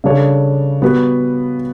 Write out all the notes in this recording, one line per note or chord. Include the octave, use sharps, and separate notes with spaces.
C#3 G3 D4 A4 C#5
G3 B3 F#4 B4